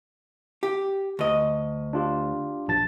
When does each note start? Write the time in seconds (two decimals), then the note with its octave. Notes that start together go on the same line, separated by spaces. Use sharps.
0.63 G4
1.19 D2 D#5
1.93 D4 F4 G4
2.68 A#1 A5 A6